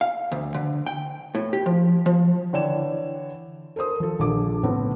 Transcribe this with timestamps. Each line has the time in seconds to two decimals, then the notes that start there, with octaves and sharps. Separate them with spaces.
0.01 F5
0.32 D2
0.54 D3
0.86 G5
1.35 A2
1.53 G4
1.66 F3
2.06 F3
2.53 D3 E3 C#5 D5 G5 E7
3.76 A4 A#4 C5 D#6
4.00 F3 A4
4.19 A#1 D3 F3 D6
4.63 A2 C#3 B3 C4